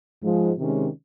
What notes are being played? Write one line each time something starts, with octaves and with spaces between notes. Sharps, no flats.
G#2 F3 G#3
C3 D#3 G#3 C#4